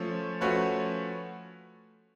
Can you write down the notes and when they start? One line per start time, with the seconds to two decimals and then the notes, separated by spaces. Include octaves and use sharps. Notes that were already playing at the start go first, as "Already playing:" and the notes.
Already playing: F3 A3 C#4
0.41 F3 A3 C#4 F#4 B4